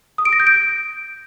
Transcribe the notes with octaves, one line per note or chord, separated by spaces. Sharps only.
D#6
D7
A#6
G6
D7